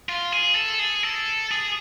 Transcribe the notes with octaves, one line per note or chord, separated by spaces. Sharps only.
F4
G#4
A4
G#4
A4
G#4